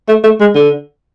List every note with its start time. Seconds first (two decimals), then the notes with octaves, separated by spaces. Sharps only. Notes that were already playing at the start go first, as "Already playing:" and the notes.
0.08 A3
0.24 A3
0.40 G#3
0.55 D3